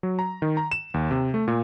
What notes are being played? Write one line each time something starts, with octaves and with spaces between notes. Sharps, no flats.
F#3
A#5
D#3
A#5
E7
D#2
C3
A3
A#2